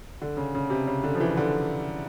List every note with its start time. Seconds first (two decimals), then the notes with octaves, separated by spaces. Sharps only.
0.22 D3
0.37 C#3
0.55 C#3
0.70 C3
0.87 C#3
1.04 D3
1.15 F3
1.20 E3
1.37 D3